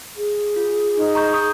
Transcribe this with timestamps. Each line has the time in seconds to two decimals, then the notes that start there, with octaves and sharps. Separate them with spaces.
0.17 G#4
0.56 F4
0.97 D#4
1.15 A#5 C#6 G6
1.33 C#6 D#6 G6